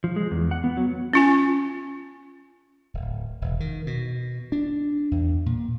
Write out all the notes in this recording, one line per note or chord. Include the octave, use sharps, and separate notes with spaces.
F3
G#3
E2
F#5
B3
F#3
C#4 F4 G#5
D1
E1
D#3
B2
D4
E2
A#2